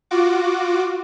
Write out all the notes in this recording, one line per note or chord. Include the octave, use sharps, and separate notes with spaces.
F4 F#4 D6